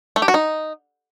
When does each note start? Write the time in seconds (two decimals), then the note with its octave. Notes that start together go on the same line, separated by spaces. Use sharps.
0.16 A3
0.22 G4
0.28 F#4
0.34 D#4